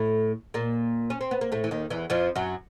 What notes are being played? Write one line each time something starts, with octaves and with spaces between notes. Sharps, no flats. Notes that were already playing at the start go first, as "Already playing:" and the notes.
Already playing: A2 A3
A#2 A#3
C#4
C4
B3
A#3
A2 A3
E3
D#2 D#3
E2 E3
F2 F3
F#2 F#3